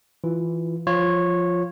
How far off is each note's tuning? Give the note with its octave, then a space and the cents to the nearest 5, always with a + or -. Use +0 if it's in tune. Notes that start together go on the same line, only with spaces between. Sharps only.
E3 +0 F4 +0
F3 +0 F4 +0 C#5 -15